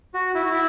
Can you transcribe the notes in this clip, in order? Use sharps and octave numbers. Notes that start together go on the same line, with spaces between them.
F#4
E4
F#4
E4